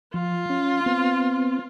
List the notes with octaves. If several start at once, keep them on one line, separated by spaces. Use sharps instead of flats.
F3 F4
C#4
B3 C4